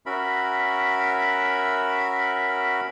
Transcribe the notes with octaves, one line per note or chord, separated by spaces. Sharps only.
C#4 F#4 A#4 E5 B5